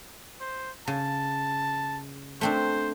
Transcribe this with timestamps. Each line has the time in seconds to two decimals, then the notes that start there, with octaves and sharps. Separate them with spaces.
0.40 C5
0.88 C#3 A5
2.41 A3 C4 D4 C5